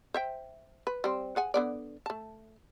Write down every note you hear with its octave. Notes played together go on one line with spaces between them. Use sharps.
C5 E5 G5
B4
G3 C4
G#4 F#5 G#5
D3 B3 D5
A3 A5